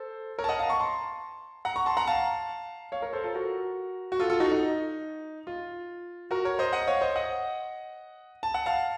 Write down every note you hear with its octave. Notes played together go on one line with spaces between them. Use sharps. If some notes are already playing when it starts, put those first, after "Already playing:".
Already playing: A4 C5
A#4 C#5
A5
D#5 F#5
F5 A5
A#5 C#6
A5 C6
F#5 A#5
A#5 C#6
A5 C6
F#5 A#5
F5 A5
C#5 F5
A#4 C#5
A4 C5
F4 A4
F#4 A#4
F#4
F4 A4
F4 A4
D#4 F#4
D#4
F4
F#4 A#4
A#4 C#5
C5 D#5
D#5 F#5
C#5 F5
C5 D#5
D#5 F#5
A5
F#5
F5 A5